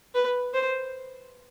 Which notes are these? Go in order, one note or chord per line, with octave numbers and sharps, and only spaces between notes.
B4
C5